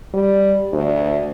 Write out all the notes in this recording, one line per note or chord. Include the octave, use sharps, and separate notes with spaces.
G3
D2